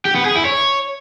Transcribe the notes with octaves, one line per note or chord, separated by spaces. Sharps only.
G4
B3
G#4
E4
C#5